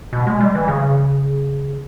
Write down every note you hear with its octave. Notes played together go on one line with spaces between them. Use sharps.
B2
G#3
G3
E3
C#3